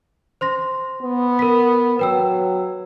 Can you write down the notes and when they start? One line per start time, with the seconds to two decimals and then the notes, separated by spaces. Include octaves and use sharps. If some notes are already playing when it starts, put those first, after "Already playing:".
0.41 C5 C6 A#6
1.02 B3
1.39 A#4 B6
1.99 F#3 B4 G5 E6